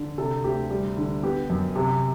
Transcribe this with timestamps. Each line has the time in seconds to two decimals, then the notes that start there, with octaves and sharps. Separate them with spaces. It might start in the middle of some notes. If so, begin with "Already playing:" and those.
Already playing: D3
0.18 C3 A4
0.44 D2 G4
0.71 G3
0.97 D3
1.23 B3 G4
1.50 F#2
1.76 C3